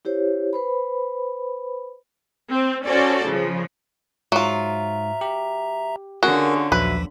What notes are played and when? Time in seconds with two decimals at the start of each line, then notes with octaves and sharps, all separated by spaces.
0.05 E4 G4 C5 C#5
0.53 B4 C5 B5
2.51 C4
2.86 C#4 F#4 A4 C5 D5
3.27 C#3 F3
4.32 G#2 F#3 F4 E5 A#5
5.21 G4
6.23 D3 C#4 F4 F#4 G#4 A#4
6.72 A#1 D#2 F3 F#3 B4 E5